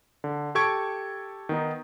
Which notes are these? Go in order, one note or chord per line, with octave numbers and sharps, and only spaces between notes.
D3
G4 A4 C#6 G#6 D7
D#3 B3 D#4